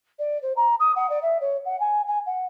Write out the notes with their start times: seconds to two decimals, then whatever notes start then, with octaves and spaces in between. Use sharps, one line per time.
0.19 D5
0.42 C5
0.56 A#5
0.79 D#6
0.95 F#5
1.09 D5
1.22 E5
1.41 C#5
1.65 F#5
1.80 G#5
2.07 G#5
2.26 F#5